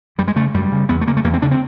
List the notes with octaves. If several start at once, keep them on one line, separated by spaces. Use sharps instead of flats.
F#2 G3
G#3
C#3 A3
F#2 G3
C#3
E2 B3
A3
C#3 A#3
A3
E2 A#3
C4
C#3 D4
C4